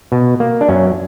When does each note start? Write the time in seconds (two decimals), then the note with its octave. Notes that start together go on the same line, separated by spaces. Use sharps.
0.12 B2
0.40 A#3
0.61 D4
0.69 F#2 C#4